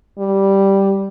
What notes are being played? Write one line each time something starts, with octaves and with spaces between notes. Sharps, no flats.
G3